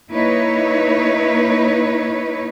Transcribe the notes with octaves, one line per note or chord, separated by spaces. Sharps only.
A#3 D#4 E4 B4 C#5